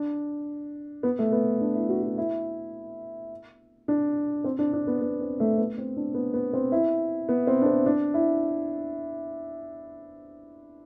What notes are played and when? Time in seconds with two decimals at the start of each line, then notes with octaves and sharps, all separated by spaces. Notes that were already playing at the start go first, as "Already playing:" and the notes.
Already playing: D4
1.03 B3
1.19 A3
1.32 B3
1.61 D4
1.75 E4
1.89 F#4
2.03 F#4
2.18 E4
3.88 D4
4.44 C4
4.59 D4
4.73 D4
4.87 B3
5.01 B3
5.21 C4
5.40 A3
5.58 B3
5.78 C4
5.97 D4
6.14 B3
6.34 B3
6.53 C4
6.72 E4
7.29 B3
7.47 C4
7.62 D4
7.66 C4
7.86 D4
8.14 E4